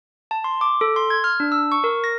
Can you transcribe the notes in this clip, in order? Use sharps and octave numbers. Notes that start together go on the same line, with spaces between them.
A5
C6
D6
A4
C6
G#6
F6
D4
E6
C#6
A#4
A#6